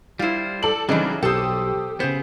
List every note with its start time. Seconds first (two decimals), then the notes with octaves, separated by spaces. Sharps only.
0.19 G3 E4 F4 C5
0.63 A4 D5 F#7
0.89 C#3 E3 F#3 G3 C4 D4 D#4
1.23 B1 G4 A4 C5 D#6
2.00 C#3 B3 C5